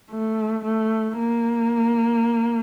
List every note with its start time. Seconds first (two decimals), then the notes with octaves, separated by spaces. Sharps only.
0.11 A3
0.65 A3
1.18 A#3